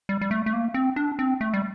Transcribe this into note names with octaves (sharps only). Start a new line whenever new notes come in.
G3
G3
A3
A3
A#3
C4
D4
C4
A3
G3